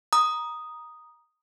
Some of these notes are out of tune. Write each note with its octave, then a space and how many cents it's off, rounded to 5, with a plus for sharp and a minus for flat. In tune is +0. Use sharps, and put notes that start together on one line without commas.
A#5 +20 D#6 +0